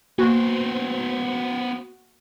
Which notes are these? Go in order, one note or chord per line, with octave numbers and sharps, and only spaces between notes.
A#3 B3 F#4 C5